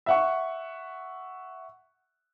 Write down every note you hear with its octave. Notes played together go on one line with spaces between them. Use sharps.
E5 F#5 C#6